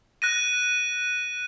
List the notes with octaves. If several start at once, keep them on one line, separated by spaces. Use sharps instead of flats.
F#6 A#6 D#7